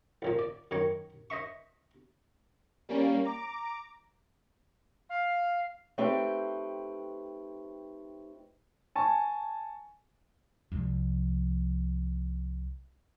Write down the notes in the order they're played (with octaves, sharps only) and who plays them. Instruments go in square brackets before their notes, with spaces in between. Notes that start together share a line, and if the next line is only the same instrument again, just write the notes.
[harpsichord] A1 A#2 F3
D5
F#2 D#3 C#5
C5 D#5 E5 C#6
[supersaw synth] G3 A#3 C#4
A#5 D6
[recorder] F5
[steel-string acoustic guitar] A3 C4 D#4 G4 B4 G5
[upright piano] G#5 A5 C#6
[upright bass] C2 F3